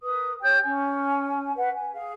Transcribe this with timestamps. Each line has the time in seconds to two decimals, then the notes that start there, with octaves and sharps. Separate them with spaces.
0.02 A#4 B4 D#6
0.42 G4 C#5 G5 G6
0.63 C#4 G#5
1.56 B4 F#5
1.73 G#5
1.94 G#4 F5